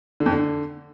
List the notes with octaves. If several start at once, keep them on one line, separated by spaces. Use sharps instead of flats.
D3
F2
D3